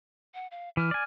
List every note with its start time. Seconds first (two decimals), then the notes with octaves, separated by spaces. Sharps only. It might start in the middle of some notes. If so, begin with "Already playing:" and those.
0.34 F#5
0.51 F5
0.77 E3 F6
0.91 D5 G#5